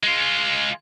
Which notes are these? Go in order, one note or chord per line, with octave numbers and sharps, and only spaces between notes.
G#3 F4